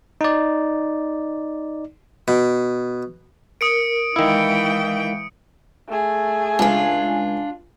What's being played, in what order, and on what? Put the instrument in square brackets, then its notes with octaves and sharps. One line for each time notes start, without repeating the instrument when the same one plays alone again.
[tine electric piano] D#4 D5
[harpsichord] B2
[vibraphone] A#4 [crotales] D#6 C#7 D7
[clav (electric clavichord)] D#3 E4 [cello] E3 G5 [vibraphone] G#3 F5
[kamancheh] A3 G#4
[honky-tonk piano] C#2 G#5 [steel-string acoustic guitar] D4 F4